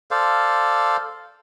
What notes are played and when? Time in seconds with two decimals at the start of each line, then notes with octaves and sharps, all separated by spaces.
0.11 A4 C5 D5 F5